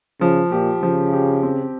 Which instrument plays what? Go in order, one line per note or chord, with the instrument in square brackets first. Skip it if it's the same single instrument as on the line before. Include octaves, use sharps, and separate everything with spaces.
[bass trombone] C#3 [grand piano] F3
[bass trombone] A#2 [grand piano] G4
[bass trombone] C#3 [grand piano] F3
[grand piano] G4
C4